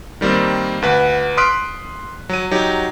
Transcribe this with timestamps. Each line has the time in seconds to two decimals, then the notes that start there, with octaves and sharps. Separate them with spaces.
0.21 D#3 G3 A#3 C4
0.82 D2 B4 F#5
1.37 C6 D#6 F6 F#6 B6 D7
2.29 F#3 D#7
2.51 F#3 D#4 G4